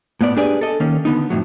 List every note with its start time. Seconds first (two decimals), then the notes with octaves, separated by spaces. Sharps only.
0.21 A2 B3 D5
0.37 D4 G4 G#4 B4 D5
0.61 A4 D#5
0.80 D#3 A#3 C#4
1.05 D3 B3 D#4
1.30 F2 A2 F#3